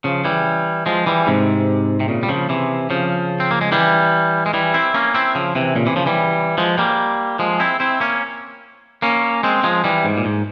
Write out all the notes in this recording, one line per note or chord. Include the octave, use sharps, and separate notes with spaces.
C#3 F3
E3 G3
F3 G#3
E3 G3
G#2 C3
C3
A#2 C#3
G3
C#3 F3
C3 E3
C#3 F3
C4
A#3
G#3
E3 G3
G#3
E3 G3
C4 E4
A#3 C#4
C4 E4
C#3 F3
C3 E3
A#2 C#3
C3 E3
C#3 F3
E3 G3
F3 G#3
G3 A#3
F3 G#3
C4 E4
C4 E4
A#3 C#4
A#3 C#4
G#3 C4
F3 G#3
E3 G3
G#2
A#2
G#2